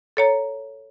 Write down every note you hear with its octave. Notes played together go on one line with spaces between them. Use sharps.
A4 C#5 A#5